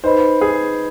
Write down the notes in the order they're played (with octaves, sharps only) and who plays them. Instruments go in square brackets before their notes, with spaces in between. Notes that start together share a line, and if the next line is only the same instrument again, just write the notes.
[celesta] D#4 B4 D#5 B5 [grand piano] C5
[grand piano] G#4